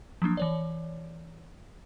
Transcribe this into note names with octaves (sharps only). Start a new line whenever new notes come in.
F3 F#3 A#3 D4
E3 C#5 D5